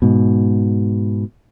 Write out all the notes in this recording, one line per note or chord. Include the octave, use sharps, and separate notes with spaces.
G#2 B2